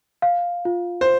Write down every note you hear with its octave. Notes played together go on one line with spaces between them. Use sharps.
F5
F4
C5